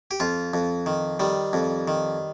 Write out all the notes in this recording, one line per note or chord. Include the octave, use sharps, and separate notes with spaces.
G4
F2 F4
F2
D#3
D#3 G3
F2
D#3